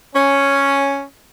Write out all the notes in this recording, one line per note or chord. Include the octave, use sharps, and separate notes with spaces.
C#4